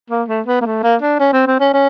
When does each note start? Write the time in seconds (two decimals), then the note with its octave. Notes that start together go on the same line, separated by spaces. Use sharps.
0.10 A#3
0.28 A3
0.47 B3
0.61 A#3
0.66 A3
0.83 A#3
1.02 D4
1.20 C#4
1.33 C4
1.47 C4
1.60 C#4
1.74 C#4